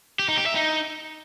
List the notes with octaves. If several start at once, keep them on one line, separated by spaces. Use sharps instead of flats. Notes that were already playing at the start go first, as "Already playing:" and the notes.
G4
D#4
G4
E5
D#4